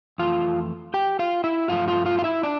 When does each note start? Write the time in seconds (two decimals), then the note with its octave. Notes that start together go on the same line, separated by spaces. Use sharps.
0.18 F2 E3 A3 F4 F5
0.94 G4 G5
1.19 F4 F5
1.44 E4 E5
1.68 G2 F3 A3 F4 F5
1.88 F4 F5
2.06 F4 F5
2.19 F5
2.24 E4 E5
2.43 D4 D5